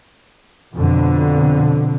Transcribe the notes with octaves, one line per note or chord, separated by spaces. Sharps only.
F2 B2 D3